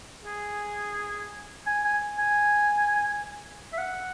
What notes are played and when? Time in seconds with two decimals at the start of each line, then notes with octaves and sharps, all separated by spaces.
0.25 G#4
1.67 G#5
1.84 G#5
2.19 G#5
3.73 E5
3.78 F#5